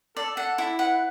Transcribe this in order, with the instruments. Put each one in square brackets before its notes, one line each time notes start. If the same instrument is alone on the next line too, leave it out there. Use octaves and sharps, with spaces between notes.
[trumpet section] A4 [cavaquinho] D5
[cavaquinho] F#5
E4
[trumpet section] B4 [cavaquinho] F#5